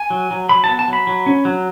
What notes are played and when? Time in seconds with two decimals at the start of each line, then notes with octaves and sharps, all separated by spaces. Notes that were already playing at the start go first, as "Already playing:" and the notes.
Already playing: G#5
0.10 F#3
0.31 F#3
0.49 F#3 B5
0.64 A5
0.69 B3
0.79 A5
0.88 F#3
0.93 B5
1.07 F#3
1.26 C#4
1.45 F#3